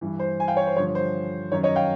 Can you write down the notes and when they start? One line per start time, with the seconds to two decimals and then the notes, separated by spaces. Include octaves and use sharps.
0.01 G2 E3
0.19 C5
0.40 G#5
0.47 F5 G5
0.57 C#5
0.67 C5
0.76 G2 D3 F3 C#5
0.95 C5
1.52 F#2 D#3 C#5
1.63 C#5 D#5
1.76 F5 G5